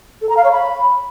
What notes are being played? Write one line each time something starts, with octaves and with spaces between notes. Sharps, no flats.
A4
A#5
F5
C#5
B5